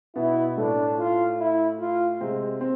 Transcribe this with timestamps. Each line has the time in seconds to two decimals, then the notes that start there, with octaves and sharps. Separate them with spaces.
0.16 B2 B3 E4
0.57 A2 A3 D4
0.98 F4
1.39 E4
1.80 F4
2.21 C3 G#3 C4
2.61 C4